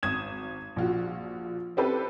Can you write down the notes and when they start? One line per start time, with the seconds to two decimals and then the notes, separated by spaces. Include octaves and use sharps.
0.03 G#1 D#6 G#6 E7
0.76 A#1 F4 F#4
1.77 C4 E4 G4 A4 B4 C5